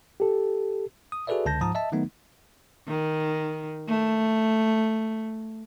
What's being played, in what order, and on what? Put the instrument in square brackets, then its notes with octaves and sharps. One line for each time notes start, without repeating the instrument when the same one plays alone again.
[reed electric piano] G4 A4
[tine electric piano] D#6
F#4 G#4 A4 B4 D5 E5
C#2 D3 A5 G6 A#6
G#2 F3 A5 A#5 D#6
D#5 E5 A5
D#3 F#3 A3 B3 D#4
[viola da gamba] D#3
A3